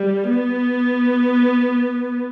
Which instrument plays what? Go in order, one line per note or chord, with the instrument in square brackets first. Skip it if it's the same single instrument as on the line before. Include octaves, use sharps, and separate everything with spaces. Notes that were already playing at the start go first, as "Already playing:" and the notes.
Already playing: [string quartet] G3
B3